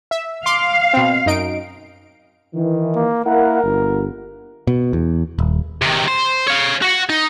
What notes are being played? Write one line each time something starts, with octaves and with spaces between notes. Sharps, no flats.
E5
F5 C6 D6
B2 C4
F#2 D#4 D7
D#3 E3
A#3
A#3 E4 A#4 F#5
G1
B2
E2
D#1
C3 D#3
C5
C#5 F5
F#4 F#5
D#4